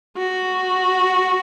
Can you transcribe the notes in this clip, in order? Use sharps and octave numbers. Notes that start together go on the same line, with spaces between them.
F#4